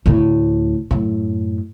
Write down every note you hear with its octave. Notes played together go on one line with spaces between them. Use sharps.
D2 A2
F#2 A2